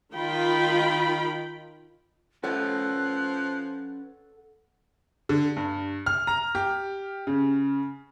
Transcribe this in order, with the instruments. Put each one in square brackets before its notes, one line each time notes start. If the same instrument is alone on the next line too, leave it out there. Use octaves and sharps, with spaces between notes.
[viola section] D#3 F4 G5 B5
[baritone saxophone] F3 [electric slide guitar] C#4 B4 C#5 [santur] A4 F#5 [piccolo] F#6
[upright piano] D3
G2
F6
A#5
G4
C#3